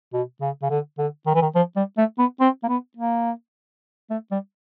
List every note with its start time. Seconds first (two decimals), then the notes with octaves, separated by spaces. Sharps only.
0.13 B2
0.41 C#3
0.62 C#3
0.70 D3
0.98 D3
1.27 D#3
1.35 E3
1.42 D#3
1.55 F3
1.76 G3
1.97 A3
2.19 B3
2.40 C4
2.63 A#3
2.68 B3
2.97 A#3
4.10 A3
4.31 G3